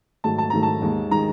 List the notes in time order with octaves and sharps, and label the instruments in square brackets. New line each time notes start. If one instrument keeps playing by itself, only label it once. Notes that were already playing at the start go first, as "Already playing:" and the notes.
[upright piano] G#2 D#3 F#3 A3 A5
A5
G#2 D#3 F#3 A3 A#5
A5
D#2 D#3 G#3
D#3 G#3 A#5